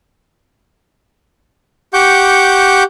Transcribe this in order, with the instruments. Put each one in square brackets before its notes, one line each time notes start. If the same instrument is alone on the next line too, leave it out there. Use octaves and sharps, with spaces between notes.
[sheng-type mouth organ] G4 F#5 C#6 D6 G6